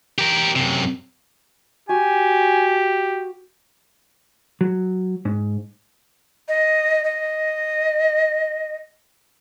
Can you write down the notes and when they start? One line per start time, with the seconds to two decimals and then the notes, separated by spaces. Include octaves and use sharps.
0.18 G4 A#4
0.56 F#2 C3
1.89 F#4 G4 G#5
4.61 F#3
5.25 G#2
6.48 D#5
7.04 D#5